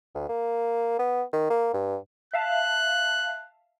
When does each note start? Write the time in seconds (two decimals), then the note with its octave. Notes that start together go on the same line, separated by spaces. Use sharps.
0.15 D2
0.29 A#3
0.99 B3
1.33 D#3
1.50 A#3
1.73 G2
2.34 E5 F5 A5 F#6